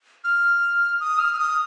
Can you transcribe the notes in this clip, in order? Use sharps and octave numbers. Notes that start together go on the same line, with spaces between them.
F6
D#6
F6
F6
D#6